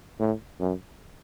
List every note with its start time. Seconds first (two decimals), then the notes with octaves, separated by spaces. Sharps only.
0.20 A2
0.60 F#2